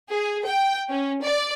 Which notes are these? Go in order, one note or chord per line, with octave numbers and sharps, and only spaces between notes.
G#4
G5
C#4
D5